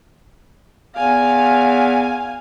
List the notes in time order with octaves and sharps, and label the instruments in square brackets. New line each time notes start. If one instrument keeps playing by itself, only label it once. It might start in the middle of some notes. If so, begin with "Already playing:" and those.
[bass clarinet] E2 [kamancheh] F5 G#5